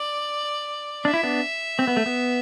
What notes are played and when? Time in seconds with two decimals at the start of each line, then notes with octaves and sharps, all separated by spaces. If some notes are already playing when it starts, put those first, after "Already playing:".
Already playing: D5
1.05 D4 E5
1.14 E4
1.23 B3 D4
1.79 C4
1.87 B3
1.97 A3
2.06 B3